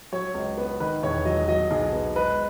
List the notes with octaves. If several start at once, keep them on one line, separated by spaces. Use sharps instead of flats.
F#3 C#5
C#2
B3
D#3 B4
E1 C#5
F#3 D#5
F#3 D#5
B1 G#4
B3
G#3 B4